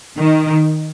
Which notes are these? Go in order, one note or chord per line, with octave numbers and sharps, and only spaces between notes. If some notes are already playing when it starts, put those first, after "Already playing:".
D#3